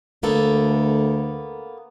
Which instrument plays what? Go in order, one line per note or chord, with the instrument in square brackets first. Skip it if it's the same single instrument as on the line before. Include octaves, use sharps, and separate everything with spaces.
[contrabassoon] D2 [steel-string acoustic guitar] A#3 B3 A4